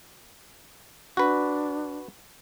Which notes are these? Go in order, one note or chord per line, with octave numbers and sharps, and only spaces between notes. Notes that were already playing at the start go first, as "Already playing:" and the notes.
D4 F#4 B4